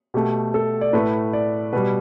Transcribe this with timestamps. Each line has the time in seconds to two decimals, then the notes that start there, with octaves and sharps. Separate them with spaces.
0.14 B2 A3 G4
0.54 A4
0.81 D5
0.93 A2 A3 B4
1.33 D5
1.73 B2 G3 B4